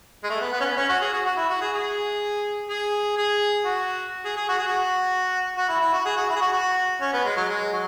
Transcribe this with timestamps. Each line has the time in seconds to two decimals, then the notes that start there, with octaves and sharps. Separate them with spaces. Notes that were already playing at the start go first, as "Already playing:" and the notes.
0.24 G#3
0.30 A3
0.41 B3
0.53 B3
0.61 C#4
0.65 B3
0.77 C#4
0.89 F#4
1.01 G#4
1.13 F#4
1.25 F#4
1.37 E4
1.49 F#4
1.61 G#4
1.73 G#4
2.69 G#4
3.17 G#4
3.65 F#4
4.25 G#4
4.36 G#4
4.49 F#4
4.58 G#4
4.67 F#4
5.57 F#4
5.69 E4
5.80 E4
5.93 F#4
6.05 G#4
6.17 F#4
6.29 E4
6.36 G#4
6.41 F#4
6.53 F#4
7.01 C#4
7.13 B3
7.25 G#3
7.36 F#3
7.49 G#3
7.72 F#3